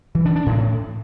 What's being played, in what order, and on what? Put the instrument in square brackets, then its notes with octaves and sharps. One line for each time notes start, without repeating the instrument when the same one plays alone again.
[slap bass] E3
D4
D4
A2